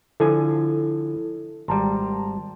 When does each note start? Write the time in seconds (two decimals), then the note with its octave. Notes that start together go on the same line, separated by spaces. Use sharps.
0.20 D3 F3 E4 A4 G#5
1.68 G#1 G3 A5 A#5 C6